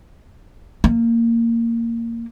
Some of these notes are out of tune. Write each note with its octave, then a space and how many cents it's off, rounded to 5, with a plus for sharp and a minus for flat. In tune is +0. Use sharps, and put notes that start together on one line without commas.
A#3 -15